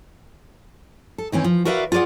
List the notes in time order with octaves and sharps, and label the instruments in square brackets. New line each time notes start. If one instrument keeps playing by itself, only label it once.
[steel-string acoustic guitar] A4
D#3 E3 C4 C#4
F3
F#4 A#4 B4 D5 E5 F5
F4 G#4 A#4 D5 F#5